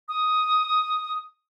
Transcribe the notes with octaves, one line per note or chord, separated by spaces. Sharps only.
D#6